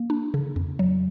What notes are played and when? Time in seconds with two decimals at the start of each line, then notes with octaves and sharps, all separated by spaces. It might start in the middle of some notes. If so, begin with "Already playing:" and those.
Already playing: A#3
0.10 D4
0.34 C#3
0.56 F2
0.79 F#3